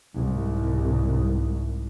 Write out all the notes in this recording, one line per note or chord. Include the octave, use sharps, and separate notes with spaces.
C2 G#2